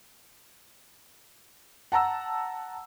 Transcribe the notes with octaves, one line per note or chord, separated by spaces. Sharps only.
F#5 A5 A#5 E6